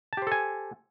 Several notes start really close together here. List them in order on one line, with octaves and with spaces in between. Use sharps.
A5 G4 C5 A4 G#5